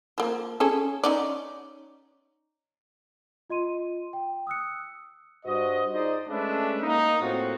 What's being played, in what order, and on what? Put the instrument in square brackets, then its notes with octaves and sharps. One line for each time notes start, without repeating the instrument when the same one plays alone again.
[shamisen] F3 A#3
C#4 G#4 A4
C#4 D#4 D5
[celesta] F4 D#5 C6 D#7
G5
D#6 E6 F#6 C#7
[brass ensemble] G2 F#4 C5 D#5
D#4 F4 G#4 C5 D5 D#5
G#3 A3 C#4 D4 B4 E5
A#3 D#4
A2 A#3 C4 F4 F#4